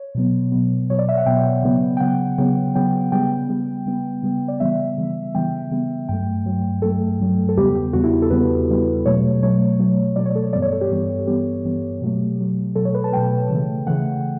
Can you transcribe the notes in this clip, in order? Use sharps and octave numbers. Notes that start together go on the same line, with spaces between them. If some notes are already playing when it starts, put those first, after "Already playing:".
Already playing: C#5
B2 F#3 B3
B2 F#3 B3
B2 F#3 B3 C#5
D5
E5
F#5
B2 F#3 B3 G5
C#3 F#3 B3
G5
C#3 F#3 B3 F#5
C#3 F#3 B3 G5
C#3 F#3 B3 G5
C#3 G3 B3 G5
C#3 G3 B3
C#3 G3 B3
C#3 G3 B3
D5
C#3 E3 G3 B3 E5
C#3 E3 G3 B3
C#3 E3 G3 B3 G5
C#3 E3 G3 B3
G2 F#3 A3 G5
G2 F#3 A3
G2 F#3 A3 A4
G2 F#3 A3
A4
E2 C#3 G3 B3 G4
G4
E2 C#3 G3 B3 F#4
E4
F#4
A4
E2 C#3 G3 B3 B4
E2 C#3 G3 B3
B2 F#3 A3 C#5
B2 F#3 A3 C#5
B2 F#3 A3
B2 F#3 A3 D5
C#5
A4
C#5
G2 E3 G3 B3 D5
C#5
A4
G4
G2 E3 G3 B3
G2 E3 G3 B3 G4
G2 E3 G3 B3
B2 F#3 A3
B2 F#3 A3
B2 F#3 A3 A4
C#5
B4
A5
B2 F#3 A3 G5
C#3 E3 A3
C#3 E3 A3 F#5